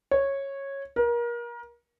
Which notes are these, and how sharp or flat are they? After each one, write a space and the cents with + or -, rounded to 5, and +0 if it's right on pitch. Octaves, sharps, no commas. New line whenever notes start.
C#5 -10
A#4 +30